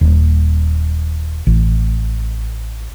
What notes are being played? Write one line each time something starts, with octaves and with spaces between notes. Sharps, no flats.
D#1
A1